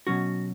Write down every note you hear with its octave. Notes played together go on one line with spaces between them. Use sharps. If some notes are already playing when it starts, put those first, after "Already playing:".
B2 F#3 C#4 F#4